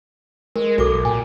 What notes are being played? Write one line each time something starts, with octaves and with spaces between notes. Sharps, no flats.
G#3 A#4
B1 F#4 A4 D6
A#2 G#5